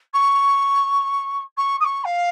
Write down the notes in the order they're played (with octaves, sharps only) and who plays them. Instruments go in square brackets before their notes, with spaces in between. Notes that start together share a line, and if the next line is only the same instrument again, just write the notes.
[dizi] C#6
C#6
D#6
C#6
F5